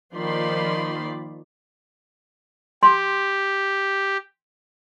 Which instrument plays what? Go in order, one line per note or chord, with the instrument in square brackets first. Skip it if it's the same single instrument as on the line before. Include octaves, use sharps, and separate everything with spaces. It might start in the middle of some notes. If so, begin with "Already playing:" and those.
[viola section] D#3 F3 A#3 D5 B5 C6
[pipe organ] G4 [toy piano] C6